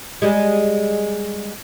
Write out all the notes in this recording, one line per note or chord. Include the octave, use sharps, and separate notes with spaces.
G3 G#3